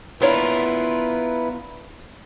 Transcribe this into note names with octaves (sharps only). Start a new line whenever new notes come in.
B3 D4 E4 F4 A#4 B4 C#5